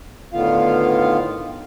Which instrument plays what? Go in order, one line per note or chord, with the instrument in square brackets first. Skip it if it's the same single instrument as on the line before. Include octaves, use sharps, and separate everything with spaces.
[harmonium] A2 D3 D#3 B3 F4 F5